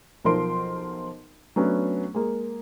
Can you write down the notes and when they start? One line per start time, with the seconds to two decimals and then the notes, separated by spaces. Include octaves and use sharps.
0.25 B1 F3 A#4 C5 C6 D7
1.56 F#3 A3 B3 C#4 D4
2.14 G#3 A#3